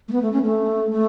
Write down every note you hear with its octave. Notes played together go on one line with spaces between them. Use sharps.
A3
B3
A3
C#4
A3
A3